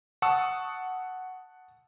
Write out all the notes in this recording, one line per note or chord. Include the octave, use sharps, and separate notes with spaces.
F#5 A5 C#6 D#6 E6 C#7